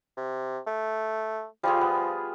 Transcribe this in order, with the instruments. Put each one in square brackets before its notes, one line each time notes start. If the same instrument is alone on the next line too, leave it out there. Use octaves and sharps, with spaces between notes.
[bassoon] C3
A3
[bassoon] F3 [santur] G3 F4 G#4
[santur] B3